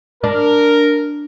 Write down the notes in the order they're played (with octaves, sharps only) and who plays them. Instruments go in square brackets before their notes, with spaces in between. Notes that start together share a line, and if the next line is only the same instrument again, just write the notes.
[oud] D4 [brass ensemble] A#4